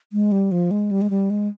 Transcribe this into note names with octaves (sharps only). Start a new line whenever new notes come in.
G#3
G3
F3
G#3
G3
G#3
G3
G#3